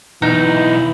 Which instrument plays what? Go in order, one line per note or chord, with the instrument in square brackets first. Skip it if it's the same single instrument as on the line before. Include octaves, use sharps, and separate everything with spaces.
[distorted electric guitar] B1 E4 [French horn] E3 [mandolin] D#4